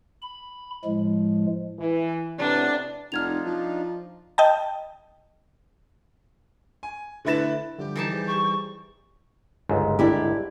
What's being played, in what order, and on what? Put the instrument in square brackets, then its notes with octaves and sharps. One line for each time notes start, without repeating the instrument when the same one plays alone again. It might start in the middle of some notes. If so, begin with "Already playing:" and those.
[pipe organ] B5
A2 F3 G#3
[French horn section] E3
[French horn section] A2 C3 B3 [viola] D4 [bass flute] D5
[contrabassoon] F1 [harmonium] D4 D#4 F4 [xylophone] F6 G#6 F7
[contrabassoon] F3
[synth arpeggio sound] D#5 G5 A5
[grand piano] G#5
D3 A3 E4 B4 A6 E7
[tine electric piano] D3 F3 G3 [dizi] G4
[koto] E3 D#4 A5
[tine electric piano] G3 G#4 C5
[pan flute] C#6
[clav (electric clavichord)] G1 C#2 G#2
[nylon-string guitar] D4 E4 G4